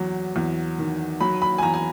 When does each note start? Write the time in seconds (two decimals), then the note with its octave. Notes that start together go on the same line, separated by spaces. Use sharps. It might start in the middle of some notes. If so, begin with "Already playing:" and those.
Already playing: E2 F#3
0.36 E2
0.78 D#3
1.21 F#3 B5
1.42 B5
1.58 G#5
1.63 E2 A#5
1.74 G#5